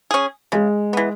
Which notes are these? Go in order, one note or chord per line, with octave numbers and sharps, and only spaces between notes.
C#4 G#4
C#3 G#3
E3 B3